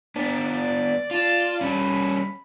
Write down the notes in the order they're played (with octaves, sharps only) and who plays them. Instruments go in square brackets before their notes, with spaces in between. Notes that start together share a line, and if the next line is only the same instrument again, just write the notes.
[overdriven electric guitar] B3 D4 [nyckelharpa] D5
[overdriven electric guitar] F4 [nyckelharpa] D5 A5
[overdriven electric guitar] G3 C#4 [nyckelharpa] B5